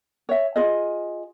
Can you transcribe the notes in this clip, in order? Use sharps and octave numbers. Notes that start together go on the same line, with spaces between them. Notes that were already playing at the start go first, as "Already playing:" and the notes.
C#5 E5
F4 G#4 D#5